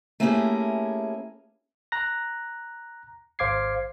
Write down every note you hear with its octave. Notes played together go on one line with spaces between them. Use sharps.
A3 A#3 C#4 E4 G4 G#4
A#5 F#6 A#6
G#1 C5 F5 D6 G#6 C7